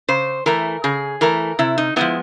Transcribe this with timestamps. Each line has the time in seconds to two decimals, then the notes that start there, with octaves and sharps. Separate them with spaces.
0.08 C#3 C5
0.46 E3 A3 A#4
0.84 C#3 G#4
1.21 E3 A3 A#4
1.59 C3 E4
1.78 D#4
1.96 F3 G#3 B3 E4